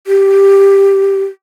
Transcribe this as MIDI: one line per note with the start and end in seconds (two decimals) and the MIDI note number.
0.07 1.24 67